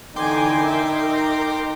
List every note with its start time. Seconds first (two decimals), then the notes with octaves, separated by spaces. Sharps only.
0.16 D3 E3 D#4 G5 G#5 C6 D6
0.60 A#4 E5
1.02 A#4 A#5